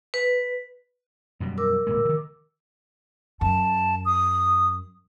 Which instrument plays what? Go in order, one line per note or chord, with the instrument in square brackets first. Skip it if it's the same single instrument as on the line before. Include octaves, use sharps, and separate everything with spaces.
[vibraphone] B4
[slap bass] F#2 B2 G3
[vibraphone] A#4 D6 E6
[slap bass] D1 A#2 G#3
D3 D#3
[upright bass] F#2 [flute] A5
[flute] D#6